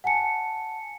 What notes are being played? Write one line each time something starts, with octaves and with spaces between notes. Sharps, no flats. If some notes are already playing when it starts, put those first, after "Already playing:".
F#5 G#5 A5 C#7